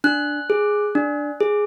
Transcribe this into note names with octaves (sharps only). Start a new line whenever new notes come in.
D4 F#6
G#4
D4
G#4